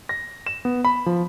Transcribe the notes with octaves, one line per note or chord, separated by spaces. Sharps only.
A#6
E7
B3
B5
F3